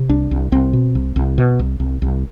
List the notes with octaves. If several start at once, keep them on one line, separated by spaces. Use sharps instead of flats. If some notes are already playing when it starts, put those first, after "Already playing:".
Already playing: C3
C2 D4
C2
C2 C4
B2
C2
C2
B2
C2
C2
C2